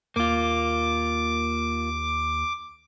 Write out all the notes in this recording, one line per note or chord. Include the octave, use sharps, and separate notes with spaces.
D#2 A#3 F4 D6